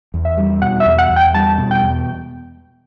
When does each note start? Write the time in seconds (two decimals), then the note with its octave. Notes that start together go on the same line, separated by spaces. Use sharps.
0.14 E2
0.25 E5
0.37 G3
0.62 B2 F#5
0.80 E5
0.86 E2
0.98 F#5
1.10 E2
1.16 G5
1.34 G3 A5
1.58 B2
1.71 G5
1.83 E2